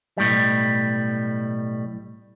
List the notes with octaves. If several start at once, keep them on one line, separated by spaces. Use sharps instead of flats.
B1 A2 G3